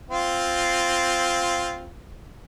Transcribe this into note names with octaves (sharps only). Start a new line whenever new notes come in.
C4 F4